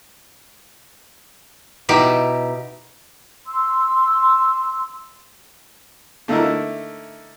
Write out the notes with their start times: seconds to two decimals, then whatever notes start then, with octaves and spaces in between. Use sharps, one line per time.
1.89 B2 D#4 E4 G4
3.47 C6 E6
6.28 D3 A3 D#4 E4 A4 A#4